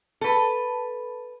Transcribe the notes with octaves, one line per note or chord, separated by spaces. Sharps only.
A4 B4